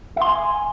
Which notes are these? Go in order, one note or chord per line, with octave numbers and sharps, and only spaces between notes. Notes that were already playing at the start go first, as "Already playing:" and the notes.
E5
C6
G#5